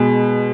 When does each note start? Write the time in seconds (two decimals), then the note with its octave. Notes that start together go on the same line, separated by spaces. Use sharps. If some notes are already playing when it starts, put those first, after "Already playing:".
Already playing: B2 G#3